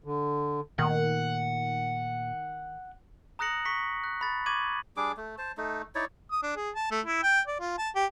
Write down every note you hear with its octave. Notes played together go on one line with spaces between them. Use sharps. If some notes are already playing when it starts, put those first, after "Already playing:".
D3
A#2 D#3 A3 F#5
A#5 D#6 F#6 A#6 C#7 F#7
C#6 B6 C#7
F#6
B5 A6
C#6 D6 G#6 D#7 F#7
G3 D4 G#4 D6
A3
C5 A5
A3 D#4
D#4 E4 C#5 D5
D#6
D4
G#4
A5
A3
E4
G5
D5
F4
A5
G4